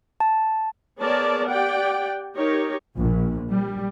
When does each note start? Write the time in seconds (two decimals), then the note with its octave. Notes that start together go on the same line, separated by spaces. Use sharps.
0.20 A5
1.00 B3 G#4 A#4 C#5 D5 A5
1.47 G4 D5 F#5 G5
2.36 D#4 G4 A#4 C#5
2.97 A#1
3.50 G3